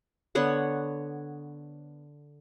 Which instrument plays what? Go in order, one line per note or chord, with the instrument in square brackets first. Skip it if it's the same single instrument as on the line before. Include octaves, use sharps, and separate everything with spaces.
[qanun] D3 B3 C#5 F#5